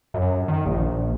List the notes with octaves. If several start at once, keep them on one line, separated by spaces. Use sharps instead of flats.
F#2
D#3
A#1